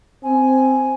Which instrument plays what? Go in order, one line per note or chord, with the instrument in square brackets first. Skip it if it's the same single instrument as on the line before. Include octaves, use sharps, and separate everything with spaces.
[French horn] C4 [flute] G#5